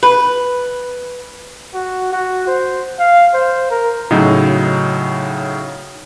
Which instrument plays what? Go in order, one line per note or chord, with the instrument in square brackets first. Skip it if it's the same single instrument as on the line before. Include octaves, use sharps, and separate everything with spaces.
[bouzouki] B4
[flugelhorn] F#4
F#4
C5
F5
C5
A#4
[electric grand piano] A2 C#3 F#3 D#4